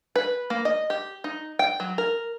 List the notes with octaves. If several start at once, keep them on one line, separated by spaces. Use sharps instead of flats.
B4
A#3
D#5
G4
D#4
G5
F#3
A#4